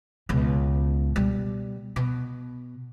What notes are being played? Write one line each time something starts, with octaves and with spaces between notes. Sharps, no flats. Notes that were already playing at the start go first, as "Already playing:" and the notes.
C#2 B2
B2 G3
B2